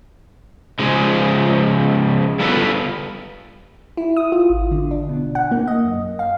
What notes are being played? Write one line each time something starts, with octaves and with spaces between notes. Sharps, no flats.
C#3 F3 G#3
G3 B3 F4 A4 B4
E4
D#6
F4
G#1
D3
D4
B2
F#5
A#3
D#5
F#2
F5